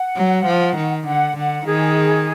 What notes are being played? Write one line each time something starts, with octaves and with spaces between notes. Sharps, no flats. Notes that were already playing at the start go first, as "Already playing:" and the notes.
Already playing: F#5
F#3
F3
D#3
D3 F#5
D3 F#5
D#3 G#4